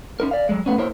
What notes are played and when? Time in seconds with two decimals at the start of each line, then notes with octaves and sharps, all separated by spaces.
0.20 C#4 D#4 A#4
0.31 D5 F5
0.49 F#3 G#3
0.66 A3 B3 C#4
0.78 A#3 E4 A#4 C5 C#5